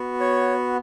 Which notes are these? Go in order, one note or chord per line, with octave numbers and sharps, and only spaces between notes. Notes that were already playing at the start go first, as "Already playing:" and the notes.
Already playing: B3 F#4
C#5